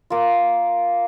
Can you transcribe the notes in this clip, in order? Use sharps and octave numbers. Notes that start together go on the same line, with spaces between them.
A#3 F4